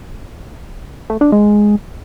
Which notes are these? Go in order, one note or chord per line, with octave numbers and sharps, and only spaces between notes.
A3
D4
G#3